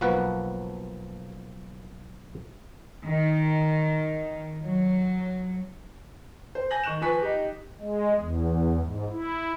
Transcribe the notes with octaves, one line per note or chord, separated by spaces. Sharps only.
B1 F3 A#3 F#4 B4 F#5
D#3
F#3
C5
G#5 G6 A#6 F#7
D#3 C#6 F#6 E7
F3 B4 G#5 C#6 F#6 B6
D#4 G4
G#3
E2
G#2
E4